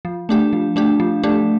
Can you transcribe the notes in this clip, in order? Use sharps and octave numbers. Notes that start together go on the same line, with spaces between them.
F3
A3 D4 G4
F3
A3 D4 G4
F3
A3 D4 G4